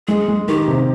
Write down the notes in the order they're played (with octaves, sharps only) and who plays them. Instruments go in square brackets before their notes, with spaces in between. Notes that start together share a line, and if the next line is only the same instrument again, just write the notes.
[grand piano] G#3 [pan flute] G#4
[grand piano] G#3
[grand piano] D#3 [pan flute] G4
[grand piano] C3